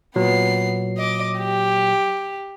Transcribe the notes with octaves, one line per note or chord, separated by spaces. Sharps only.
A#2 F#3 B3 C7
D#5 D6
G4